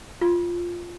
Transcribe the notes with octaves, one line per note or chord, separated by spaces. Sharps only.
F4